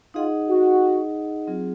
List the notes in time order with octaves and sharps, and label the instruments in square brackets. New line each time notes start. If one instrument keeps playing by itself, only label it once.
[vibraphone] D#4 G#4 D#5 F#5 [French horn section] F4
[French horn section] F#4
[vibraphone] F#3 C4 F4 G#4